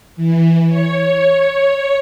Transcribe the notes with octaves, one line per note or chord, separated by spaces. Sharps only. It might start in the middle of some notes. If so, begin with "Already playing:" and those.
E3
C#5